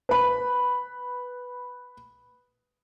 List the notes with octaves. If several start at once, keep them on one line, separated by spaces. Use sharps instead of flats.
B4 B5